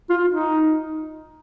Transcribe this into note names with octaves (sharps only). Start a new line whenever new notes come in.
F4
D#4